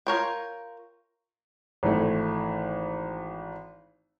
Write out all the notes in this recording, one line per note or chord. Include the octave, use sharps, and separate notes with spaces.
F4 A#4 C#5 G5
G#1 E3 A3